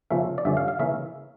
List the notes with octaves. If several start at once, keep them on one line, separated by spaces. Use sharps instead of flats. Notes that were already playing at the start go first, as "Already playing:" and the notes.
C#3 F3 A#3 C#4 E5
D5
G2 D3 F3 C#4 E5
F5
F5
C#3 E3 A#3 C#4 E5